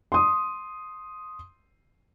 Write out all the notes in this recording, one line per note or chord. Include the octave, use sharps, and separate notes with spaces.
C6 D#6